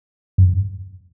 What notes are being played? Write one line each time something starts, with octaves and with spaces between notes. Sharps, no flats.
F#2